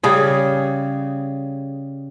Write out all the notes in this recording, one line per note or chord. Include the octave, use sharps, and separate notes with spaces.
C#3 G3 G#4